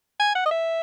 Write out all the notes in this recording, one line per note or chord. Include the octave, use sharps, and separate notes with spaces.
G#5
F#5
D#5
E5